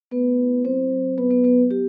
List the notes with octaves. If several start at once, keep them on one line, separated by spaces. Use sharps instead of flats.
A3 B3 B4
E4
F#3 C4 C5
F#3
B3 B4
B3 B4
F#3 B3 B4
B3 G4